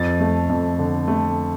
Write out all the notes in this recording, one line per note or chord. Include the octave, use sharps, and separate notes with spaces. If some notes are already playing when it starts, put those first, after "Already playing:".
Already playing: F2 A6
A3
F2
D3
A3